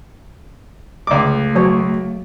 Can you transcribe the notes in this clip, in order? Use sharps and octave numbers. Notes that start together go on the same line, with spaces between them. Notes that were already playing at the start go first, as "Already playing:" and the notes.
C#2 A3 D6
F#3 C#5